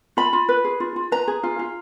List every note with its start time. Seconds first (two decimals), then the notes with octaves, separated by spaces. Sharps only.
0.17 F4 B5
0.33 F4
0.49 B4
0.64 G#4
0.80 F4
0.96 F4
1.12 B4 A#5
1.28 G#4
1.43 F4
1.59 F4